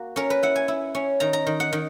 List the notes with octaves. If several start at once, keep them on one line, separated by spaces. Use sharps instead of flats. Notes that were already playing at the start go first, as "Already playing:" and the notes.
Already playing: A#3 F#4
C#4 A#4
B4
E4 F#5
G#5
E4
C#4
D#3 A#5
A#5
D#3
F#5
D#3